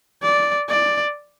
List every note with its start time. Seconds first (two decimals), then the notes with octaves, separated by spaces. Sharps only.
0.22 D5
0.69 D5